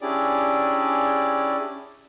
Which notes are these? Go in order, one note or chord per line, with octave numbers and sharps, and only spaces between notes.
C#4 D4 E4 G4 G#4 D5